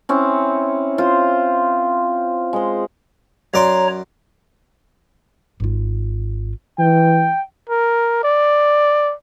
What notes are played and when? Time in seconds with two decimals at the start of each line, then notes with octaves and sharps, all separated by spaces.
0.09 C4 C#4 E4
0.98 F4 C5
2.53 G#3 C5
3.54 F#2 C#5 D5 A#5 C6
5.60 G#1 F4
6.79 E3 G5
7.69 A#4
8.23 D5